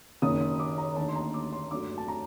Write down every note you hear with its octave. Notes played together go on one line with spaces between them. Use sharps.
F#1 F#2 D#3 D#6
D#6
D6
A#5
D#2 D3 A3 D#4 A5
C6
A#5
D6
C6
G2 F#3 A3 D4 D6
A5
A#5